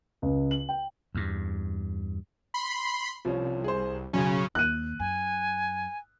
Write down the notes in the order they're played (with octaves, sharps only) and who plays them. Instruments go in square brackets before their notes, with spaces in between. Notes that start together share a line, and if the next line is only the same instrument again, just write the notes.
[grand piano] C#2
F#7
G5
[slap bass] E2 G2
[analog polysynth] B5 C6 C7
[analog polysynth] C2 [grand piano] F3 C#4
[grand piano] G#4 C5
[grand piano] B1 F#2 [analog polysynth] C#3 C#4
[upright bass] D#2 [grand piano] F#6 D#7
[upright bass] F#2 [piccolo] G#5